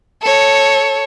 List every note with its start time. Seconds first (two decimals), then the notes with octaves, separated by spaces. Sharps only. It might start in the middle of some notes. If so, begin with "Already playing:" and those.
0.22 A4 C#5